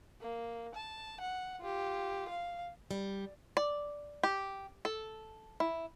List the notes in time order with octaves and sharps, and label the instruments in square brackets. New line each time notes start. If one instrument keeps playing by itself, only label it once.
[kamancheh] A#3
A5
F#5
F4 G4
F5
[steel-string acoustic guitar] G3
[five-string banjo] D5
G4
A4
E4